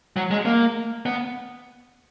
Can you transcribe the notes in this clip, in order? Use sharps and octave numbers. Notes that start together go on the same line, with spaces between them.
F#3
G#3
A#3
B3